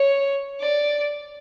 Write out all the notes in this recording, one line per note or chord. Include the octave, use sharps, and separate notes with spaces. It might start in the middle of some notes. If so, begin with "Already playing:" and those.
Already playing: C#5
D5